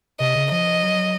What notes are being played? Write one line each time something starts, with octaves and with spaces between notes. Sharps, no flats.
C3 D#5
C#3
F3 D#5
F#3